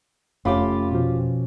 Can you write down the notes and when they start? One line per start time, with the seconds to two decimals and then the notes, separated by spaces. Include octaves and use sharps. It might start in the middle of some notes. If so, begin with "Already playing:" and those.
0.45 F1 A3 C#4 F4 G4 B5 D6
0.92 B2 F3